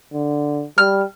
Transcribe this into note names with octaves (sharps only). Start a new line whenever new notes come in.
D3
G3 F6